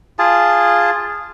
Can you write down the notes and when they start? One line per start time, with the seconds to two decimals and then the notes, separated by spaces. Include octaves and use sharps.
0.19 F4 G#4 A5